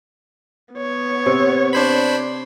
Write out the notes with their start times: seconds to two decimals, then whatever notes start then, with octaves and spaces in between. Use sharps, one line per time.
0.74 B3 C#5
1.26 C3
1.73 D4 C5 B5